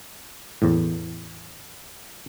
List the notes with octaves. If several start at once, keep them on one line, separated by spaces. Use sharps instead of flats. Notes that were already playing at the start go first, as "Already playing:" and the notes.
E2 A2